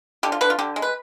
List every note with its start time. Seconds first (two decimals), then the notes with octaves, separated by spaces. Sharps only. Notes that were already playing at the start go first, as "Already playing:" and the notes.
0.23 D3 G4
0.32 F4
0.41 D3 B4
0.50 F4
0.59 D3 G4
0.76 G#3
0.82 B4